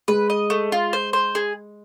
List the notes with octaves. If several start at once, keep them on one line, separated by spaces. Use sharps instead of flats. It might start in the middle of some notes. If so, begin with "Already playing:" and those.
G#3 B4
D#5
A3
F4
C5
C5
G#4